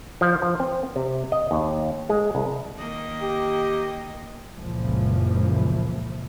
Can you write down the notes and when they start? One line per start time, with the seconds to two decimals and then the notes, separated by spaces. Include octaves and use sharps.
0.21 F3
0.42 F3
0.60 C4
0.96 C3
1.32 D#5
1.51 D#2
2.10 G#3
2.35 C2
2.77 D#3 A#3 D#5
3.22 G4
4.58 F#1 C#2 A#2 E3 F3